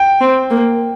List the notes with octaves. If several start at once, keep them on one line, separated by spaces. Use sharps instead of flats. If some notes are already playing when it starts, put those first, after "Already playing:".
Already playing: G5
C4
A#3